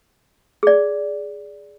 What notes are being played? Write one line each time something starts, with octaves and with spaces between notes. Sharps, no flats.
G#4 D5